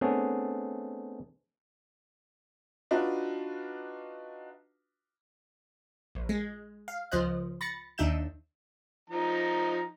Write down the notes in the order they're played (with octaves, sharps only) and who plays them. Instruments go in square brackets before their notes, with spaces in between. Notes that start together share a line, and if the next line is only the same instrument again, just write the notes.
[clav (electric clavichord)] A3 B3 C4 D4 G#4 C#5
[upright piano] D4 D#4 F4 F#4 B4
[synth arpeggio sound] A#1
G#3
F5
C#2 F3 C5 D#5 F#6
B5 A6 A#6 C#7
D#2 D4 D#4 E5 G6 E7
[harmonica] F3 D#4 A#5